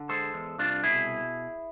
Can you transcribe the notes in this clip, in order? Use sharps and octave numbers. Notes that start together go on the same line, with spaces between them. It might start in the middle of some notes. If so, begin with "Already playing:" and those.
Already playing: D3
G#3 A4 C5
E2
C2 D4 F4
B2 E4 G#4